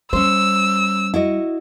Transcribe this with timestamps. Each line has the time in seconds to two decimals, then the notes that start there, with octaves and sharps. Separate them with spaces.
0.13 G3 C#4 C5 E6
1.14 E4 F#4 D#5